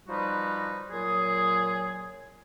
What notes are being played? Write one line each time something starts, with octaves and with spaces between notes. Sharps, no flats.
F3 G3 D#4 F#4 B4
A#2 F#3 G#4